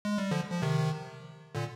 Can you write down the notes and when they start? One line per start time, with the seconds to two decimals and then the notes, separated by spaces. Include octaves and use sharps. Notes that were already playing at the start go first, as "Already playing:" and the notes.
0.05 G#3
0.18 G3
0.31 D3 F3
0.52 F3
0.62 C3 D#3
1.55 A#2 D3